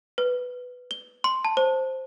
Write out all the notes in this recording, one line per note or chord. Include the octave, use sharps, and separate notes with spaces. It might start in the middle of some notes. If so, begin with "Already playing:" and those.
B4
G7
C6
A5
C5